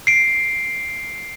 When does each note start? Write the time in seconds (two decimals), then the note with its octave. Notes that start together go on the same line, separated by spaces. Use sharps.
0.07 C7 D7